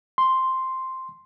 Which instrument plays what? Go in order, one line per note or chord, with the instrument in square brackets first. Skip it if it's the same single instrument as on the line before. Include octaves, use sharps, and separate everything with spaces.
[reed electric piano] C6